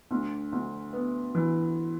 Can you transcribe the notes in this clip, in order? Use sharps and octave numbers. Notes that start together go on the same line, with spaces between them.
D2
D2
B3
E3